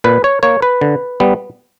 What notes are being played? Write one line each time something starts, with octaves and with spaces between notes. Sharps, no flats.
A#2 B4
C#5
A#3 C#5
B4
D3
G3 B3